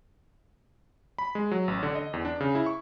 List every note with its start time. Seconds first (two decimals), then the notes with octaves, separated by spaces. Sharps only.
1.18 B5
1.35 G#3
1.51 F#3
1.68 A1
1.83 D3
1.95 D#5
2.13 E2
2.25 D4
2.40 C#3
2.55 E4
2.66 C#6